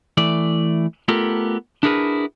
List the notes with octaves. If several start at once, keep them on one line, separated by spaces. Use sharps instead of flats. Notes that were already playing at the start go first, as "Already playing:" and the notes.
E3 A3 D5
A3 B3 F4 G4 A4 A#4
D4 E4 F#4 G#4 A#4 B4